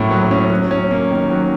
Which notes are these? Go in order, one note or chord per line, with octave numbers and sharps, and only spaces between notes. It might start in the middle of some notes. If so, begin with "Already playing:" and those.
Already playing: A2 F#3 A#3 C#4
F#3
C#4
F#3
C#4
A#3
D#3
F#3